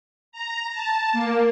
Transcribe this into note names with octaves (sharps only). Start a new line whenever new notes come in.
A#5
A5
A#3